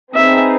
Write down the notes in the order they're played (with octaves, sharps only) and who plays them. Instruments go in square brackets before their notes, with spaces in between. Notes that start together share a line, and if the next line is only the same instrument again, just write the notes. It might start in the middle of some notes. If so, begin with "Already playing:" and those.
[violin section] C4 D#4 G#4 B4 [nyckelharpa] E5